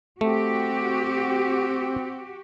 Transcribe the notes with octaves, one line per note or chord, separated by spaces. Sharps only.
A3 C4 F#4 G4